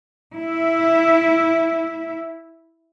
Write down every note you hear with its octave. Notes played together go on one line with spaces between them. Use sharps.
E4 E5